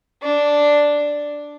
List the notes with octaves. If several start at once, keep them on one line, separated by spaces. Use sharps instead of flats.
D4